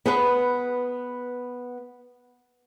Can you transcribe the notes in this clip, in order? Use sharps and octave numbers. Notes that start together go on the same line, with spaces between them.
B3 G#4 B4